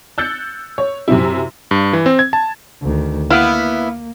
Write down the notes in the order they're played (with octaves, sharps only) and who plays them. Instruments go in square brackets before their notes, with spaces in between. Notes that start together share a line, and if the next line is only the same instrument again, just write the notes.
[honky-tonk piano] E6 F#6 G6 A6 C#7
C#5
F#2 C3 C4 E4
[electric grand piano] G2
E3
C4
G#6
A5
[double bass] D2 D#3
[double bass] A#3 [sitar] B3 E4 [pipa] F5